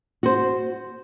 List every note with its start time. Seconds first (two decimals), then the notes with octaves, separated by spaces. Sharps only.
0.23 F#4 C5